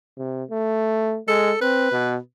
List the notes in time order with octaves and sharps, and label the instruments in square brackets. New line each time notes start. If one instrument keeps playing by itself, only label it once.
[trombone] C3
A3
[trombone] G#3 [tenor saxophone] A4
[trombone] C4 [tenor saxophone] B4
[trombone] B2